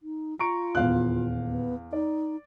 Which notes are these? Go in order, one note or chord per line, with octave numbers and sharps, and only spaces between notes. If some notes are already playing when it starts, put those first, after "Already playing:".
D#4
F4 A#5 C#6 D7
D#1 E2 F5 F#6
B3
D#4 D5